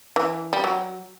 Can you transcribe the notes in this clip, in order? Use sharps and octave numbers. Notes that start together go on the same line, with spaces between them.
E3
G3
F#3